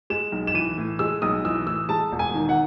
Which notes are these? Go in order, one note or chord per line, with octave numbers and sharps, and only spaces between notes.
G#3 E7
B1
E7
E3 D#7
A2
G#3 E6
B1 D#6
E3 E6
A2 E6
G#3 A5
E1
G#5
D#3
F#5